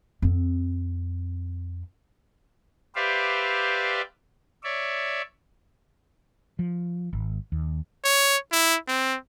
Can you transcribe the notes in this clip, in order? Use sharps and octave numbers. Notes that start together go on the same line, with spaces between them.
F2 C4
G4 B4 C5 D5 E5 F5
C#5 D5 E5
F3
G#1
D#2
C#5
E4
C4